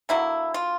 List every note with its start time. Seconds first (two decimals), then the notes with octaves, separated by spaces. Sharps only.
0.09 D3 F#3 A#3 E4
0.54 F4